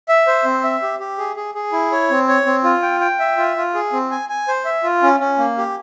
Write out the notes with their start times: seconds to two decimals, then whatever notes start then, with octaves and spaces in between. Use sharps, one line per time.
0.09 E5
0.27 C5
0.44 C4
0.64 E5
0.82 G4
0.99 G4
1.18 G#4
1.36 G#4
1.55 G#4
1.72 E4
1.92 C#5
2.10 C4
2.28 C#5
2.46 C4
2.64 F4
2.82 G5
3.00 G5
3.20 E5
3.38 F4
3.56 F4
3.74 G#4
3.93 C4
4.11 G#5
4.29 G#5
4.48 C5
4.65 E5
4.83 F4
5.02 C#4
5.20 C#4
5.38 A#3
5.58 G4